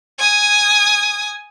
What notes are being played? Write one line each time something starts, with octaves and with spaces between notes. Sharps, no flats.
G#5 D#6